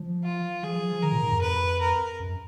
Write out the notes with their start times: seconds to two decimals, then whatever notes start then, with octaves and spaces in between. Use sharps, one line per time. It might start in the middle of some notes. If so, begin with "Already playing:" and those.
Already playing: F3
0.24 F4
0.63 F3 G#4
0.73 F3
0.92 F3
1.02 D#3 A#4
1.12 A#2
1.22 G#2
1.31 F2
1.42 B4
1.81 A#4
2.20 F#2